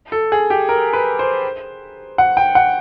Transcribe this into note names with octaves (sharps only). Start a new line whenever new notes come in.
A4
G#4
G4
A#4
B4
C5
F#5
G5
F#5